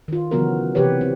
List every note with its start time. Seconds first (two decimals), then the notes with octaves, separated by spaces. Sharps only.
0.08 D#3 F4
0.31 C#3 E3 F#3 B3 F#4 A#4
0.75 C3 E3 G4 B4 C#5
1.01 C4